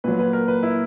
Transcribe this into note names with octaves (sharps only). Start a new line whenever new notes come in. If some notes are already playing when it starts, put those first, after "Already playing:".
A#2 F#3 B4
B4
A#4
B4
E4